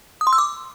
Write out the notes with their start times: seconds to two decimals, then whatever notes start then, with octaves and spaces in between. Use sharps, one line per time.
0.21 D#6
0.27 C6
0.33 E6
0.38 D6